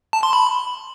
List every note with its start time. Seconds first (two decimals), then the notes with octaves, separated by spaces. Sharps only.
0.13 A5
0.23 C6
0.33 B5